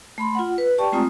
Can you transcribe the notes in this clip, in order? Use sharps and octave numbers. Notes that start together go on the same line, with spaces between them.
A3 B5 C6
F4 F#5
B4
G4 D5 G5 A5 C#6
G#3 A3 C4 F4 A#5 D#6